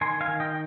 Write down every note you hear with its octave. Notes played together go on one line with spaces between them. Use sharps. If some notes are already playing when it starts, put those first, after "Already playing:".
D#3 G#5 C6
F5 G#5
D#3
D#5 G5